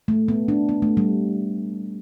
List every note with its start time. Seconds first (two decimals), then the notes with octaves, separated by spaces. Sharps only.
0.08 A3
0.28 B3
0.48 D4
0.69 B3
0.82 A3
0.97 G3